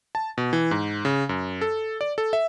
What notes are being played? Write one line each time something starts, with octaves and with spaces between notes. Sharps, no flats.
A5
B2
E3
G#2
C#3
F#2
A4
D5
A4
E5